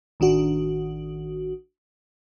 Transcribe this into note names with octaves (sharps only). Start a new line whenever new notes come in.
A1 D#3 D4 F#4